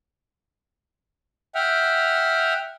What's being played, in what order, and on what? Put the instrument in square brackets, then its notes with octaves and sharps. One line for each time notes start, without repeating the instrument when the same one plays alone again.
[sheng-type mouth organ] E5 F#5 G5 F6